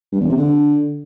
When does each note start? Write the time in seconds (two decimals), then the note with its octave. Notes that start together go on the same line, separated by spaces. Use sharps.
0.12 G2
0.20 E2
0.29 C3
0.37 D3